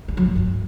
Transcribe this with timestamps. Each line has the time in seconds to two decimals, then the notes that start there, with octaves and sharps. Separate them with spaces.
0.08 G3
0.17 F#3
0.26 A2
0.35 G2